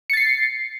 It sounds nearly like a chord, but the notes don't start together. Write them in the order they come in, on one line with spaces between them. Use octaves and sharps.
C#7 A6 C7